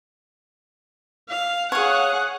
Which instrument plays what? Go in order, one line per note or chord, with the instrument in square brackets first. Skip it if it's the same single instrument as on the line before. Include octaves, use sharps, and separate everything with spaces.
[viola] F5
[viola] G#4 F#5 [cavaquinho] C#5 F5